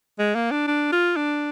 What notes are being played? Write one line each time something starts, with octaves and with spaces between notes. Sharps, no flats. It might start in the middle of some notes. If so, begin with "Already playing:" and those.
G#3
A#3
D4
D4
F4
D4